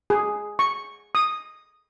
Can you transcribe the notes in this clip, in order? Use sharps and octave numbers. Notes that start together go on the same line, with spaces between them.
G#4
C#6
D#6